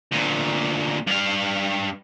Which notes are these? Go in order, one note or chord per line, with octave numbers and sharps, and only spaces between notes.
D2 A#2
G2 F5